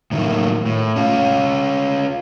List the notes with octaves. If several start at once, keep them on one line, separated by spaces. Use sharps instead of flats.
A2 D#3 F#3 A#3
A2
C#4 F4